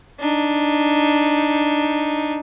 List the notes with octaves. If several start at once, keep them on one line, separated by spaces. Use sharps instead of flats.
D4 D#4